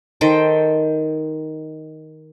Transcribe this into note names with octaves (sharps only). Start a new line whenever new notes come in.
D#3 A4 C5 G5